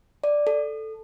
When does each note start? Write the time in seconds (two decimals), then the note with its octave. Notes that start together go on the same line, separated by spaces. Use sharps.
0.24 D5
0.47 A4